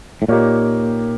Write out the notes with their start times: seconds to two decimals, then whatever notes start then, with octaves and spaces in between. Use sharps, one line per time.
0.22 A2
0.28 A#2 A#3 D#4 G4 A#4 C#5